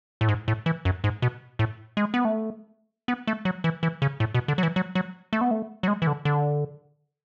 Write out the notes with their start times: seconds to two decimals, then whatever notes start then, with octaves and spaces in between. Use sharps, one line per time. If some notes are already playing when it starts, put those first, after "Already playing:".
0.21 A2
0.28 G#2
0.48 A2
0.66 E3
0.85 F#2
1.04 G#2
1.22 B2
1.59 A2
1.97 G#3
2.14 B3
2.25 A3
3.08 B3
3.27 A3
3.45 F#3
3.64 E3
3.83 E3
4.02 C#3
4.20 A2
4.34 B2
4.48 D3
4.58 F#3
4.63 E3
4.76 F#3
4.95 F#3
5.33 A3
5.41 B3
5.51 A3
5.83 F#3
5.88 G#3
6.02 E3
6.07 D3
6.25 D3